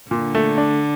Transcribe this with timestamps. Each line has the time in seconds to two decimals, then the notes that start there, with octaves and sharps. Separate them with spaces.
0.10 A#2 D3
0.35 A3
0.58 D4